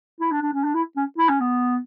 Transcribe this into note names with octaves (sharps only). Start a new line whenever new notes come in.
E4
D4
D4
C#4
D4
E4
C#4
E4
C#4
B3